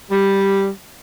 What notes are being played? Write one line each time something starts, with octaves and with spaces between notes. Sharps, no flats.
G3